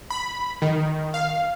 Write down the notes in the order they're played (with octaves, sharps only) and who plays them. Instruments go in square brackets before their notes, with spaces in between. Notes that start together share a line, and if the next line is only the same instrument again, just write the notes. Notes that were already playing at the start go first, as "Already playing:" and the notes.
[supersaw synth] B5
D#3
F5